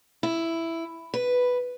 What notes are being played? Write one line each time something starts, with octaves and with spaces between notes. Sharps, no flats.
E4
B4